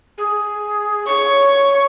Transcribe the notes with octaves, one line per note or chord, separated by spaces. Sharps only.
G#4
C#5 C#6